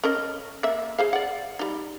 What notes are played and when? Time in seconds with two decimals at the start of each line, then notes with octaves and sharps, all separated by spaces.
0.04 C#4 A#4 D#5
0.63 A#3 E5
0.98 G#4 C5 F5
1.13 D5 F#5
1.59 G3 D#4